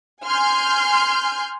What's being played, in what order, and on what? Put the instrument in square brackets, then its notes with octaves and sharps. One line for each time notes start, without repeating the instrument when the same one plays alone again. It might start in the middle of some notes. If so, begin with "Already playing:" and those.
[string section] G#5 C6 F6 G6